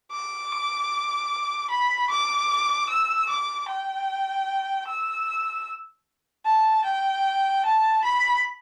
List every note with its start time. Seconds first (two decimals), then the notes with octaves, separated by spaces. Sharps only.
0.12 D6
1.70 B5
2.10 D6
2.89 E6
3.29 D6
3.69 G5
4.88 E6
6.46 A5
6.85 G5
7.65 A5
8.04 B5